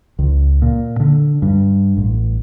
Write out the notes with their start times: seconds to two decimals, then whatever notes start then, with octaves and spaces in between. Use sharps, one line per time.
0.19 C#2
0.62 A#2
1.00 D3
1.42 G2
1.97 A1